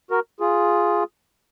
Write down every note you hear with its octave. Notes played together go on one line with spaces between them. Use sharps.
F#4 A#4
F4 G#4